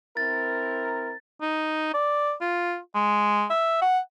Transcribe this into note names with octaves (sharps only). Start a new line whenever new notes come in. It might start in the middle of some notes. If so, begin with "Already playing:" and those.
C4 E4 A#4 A6
D#4
D5
F4
G#3
E5
F#5